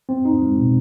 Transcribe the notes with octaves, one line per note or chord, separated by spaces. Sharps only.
C4
D#4
G#3
B2